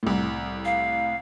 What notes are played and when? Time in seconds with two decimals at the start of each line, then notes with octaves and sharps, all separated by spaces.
0.03 C2 A2
0.65 F5